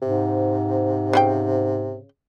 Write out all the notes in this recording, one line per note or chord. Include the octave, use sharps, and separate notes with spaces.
G#2 C3
C#3 E4 G5